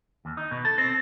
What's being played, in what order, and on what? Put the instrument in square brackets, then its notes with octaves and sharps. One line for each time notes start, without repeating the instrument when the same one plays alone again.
[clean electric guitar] D#2
D#4
B2
A4
C4